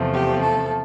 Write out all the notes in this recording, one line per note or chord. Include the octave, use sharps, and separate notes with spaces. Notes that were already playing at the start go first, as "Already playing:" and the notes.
Already playing: E2 C3 F3 A3
G4
A4